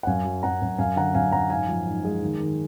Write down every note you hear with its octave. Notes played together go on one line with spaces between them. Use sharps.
F#5
F#2 F5 G#5
F#3
F#2 F#5 A#5
F#2
F#2 F5 G#5
D3 F#5 A#5
F#2 F5 G#5
F#2 F#5 A#5
G#2 F5 G#5
F3
G#2
G#3
D#3
D#3